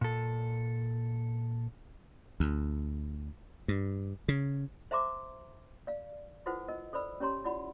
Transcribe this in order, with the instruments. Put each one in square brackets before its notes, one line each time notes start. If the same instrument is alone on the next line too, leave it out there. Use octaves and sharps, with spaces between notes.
[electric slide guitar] A#2 A4
[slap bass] D2
G2
C#3
[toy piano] C5 E5 A#5 C6 D6
D5 F5
E4 F4 A4 B4 C5 F#5
A#4 D#5
A4 C5 D5 B5 E6
C#4 G4 C#5 A#5 C6
E4 F4 D5 F#5 B5